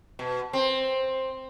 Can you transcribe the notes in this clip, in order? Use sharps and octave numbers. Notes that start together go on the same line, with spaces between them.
B2
C4